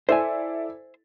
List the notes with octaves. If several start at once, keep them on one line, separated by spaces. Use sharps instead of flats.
E4 A4 C5 D5 E5 G#5